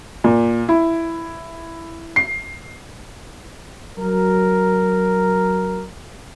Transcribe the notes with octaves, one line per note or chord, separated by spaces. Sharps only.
A#2
E4
C7
F#3 A#4